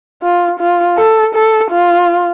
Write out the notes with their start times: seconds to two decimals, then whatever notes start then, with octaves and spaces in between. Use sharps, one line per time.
0.22 F4
0.59 F4
0.97 A4
1.35 A4
1.71 F4